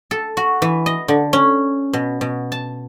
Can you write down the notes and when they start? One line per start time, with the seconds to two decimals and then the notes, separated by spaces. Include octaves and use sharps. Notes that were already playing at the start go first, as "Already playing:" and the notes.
0.11 A4
0.37 F#4
0.62 E3
0.86 D#5
1.08 D3
1.33 C#4
1.93 B2
2.21 B2
2.52 A5